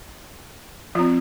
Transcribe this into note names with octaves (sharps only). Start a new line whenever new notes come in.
F3 C4 F4